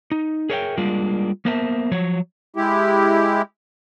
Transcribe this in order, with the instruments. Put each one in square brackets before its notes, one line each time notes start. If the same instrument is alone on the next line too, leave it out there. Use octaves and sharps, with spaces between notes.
[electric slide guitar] D#4
G#4 A#4 C#5 E5 F#5 G5
G3 G#3 A#3 D4 F4
A#3 B3 A#4 C5 E5 A5
F3 F#3 C#5
[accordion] G#3 E4 G4